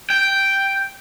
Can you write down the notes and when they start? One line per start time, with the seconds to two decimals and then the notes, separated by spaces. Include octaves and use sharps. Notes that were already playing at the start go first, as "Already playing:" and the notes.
0.10 G5